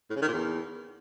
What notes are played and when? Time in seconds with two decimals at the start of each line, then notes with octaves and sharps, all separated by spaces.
0.10 A2
0.16 C#3
0.22 D#3
0.28 A#2
0.34 E2